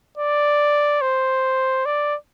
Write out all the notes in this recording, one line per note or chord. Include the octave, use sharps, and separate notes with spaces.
D5
C5
D5